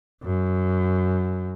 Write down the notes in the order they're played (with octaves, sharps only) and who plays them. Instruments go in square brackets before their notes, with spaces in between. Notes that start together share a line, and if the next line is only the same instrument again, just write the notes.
[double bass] F#2